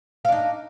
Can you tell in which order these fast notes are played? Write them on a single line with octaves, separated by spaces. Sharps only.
F5 D4 D#4